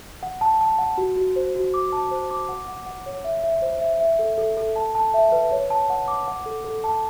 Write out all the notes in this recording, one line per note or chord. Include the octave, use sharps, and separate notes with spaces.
F#5
A5
A5
F#5
F#4
F#4
C5
F#4
D6
A5
C5
D6
F#5
F#5
F#5
C#5
E5
E5
C5
E5
E5
A4
A4
A4
A5
A5
E5
B4
C#5
A5
F#5
D6
F#5
A4
A4
A5